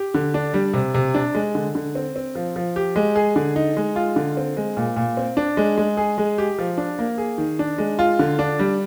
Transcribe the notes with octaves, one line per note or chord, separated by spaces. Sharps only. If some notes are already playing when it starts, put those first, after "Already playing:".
Already playing: G4
D3
D4
G3
C3
C3
D4
G#3
D3
D3
C4
C4
F3
F3
G4
G#3
G#4
D3
D#4
G#3
F4
D3
C4
G#3
A#2
A#2
C4
D4
G#3
G#3
G#4
G#3
G4
F3
D4
A#3
G#4
D#3
D4
G#3
F4
D3
D4
G3